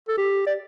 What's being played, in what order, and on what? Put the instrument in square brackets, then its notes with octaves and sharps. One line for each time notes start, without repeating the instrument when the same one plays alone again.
[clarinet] A4
G4
D5